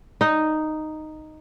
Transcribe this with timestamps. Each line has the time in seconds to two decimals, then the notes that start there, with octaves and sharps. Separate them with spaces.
0.21 D#4